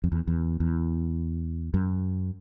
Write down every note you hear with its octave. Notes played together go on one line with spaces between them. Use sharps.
F2
E2
E2
E2
F#2